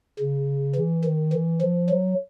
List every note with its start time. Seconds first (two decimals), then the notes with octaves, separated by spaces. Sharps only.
0.19 C#3
0.75 E3
1.04 D#3
1.33 E3
1.61 F3
1.90 F#3